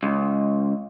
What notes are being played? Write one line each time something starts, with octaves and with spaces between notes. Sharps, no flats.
C#2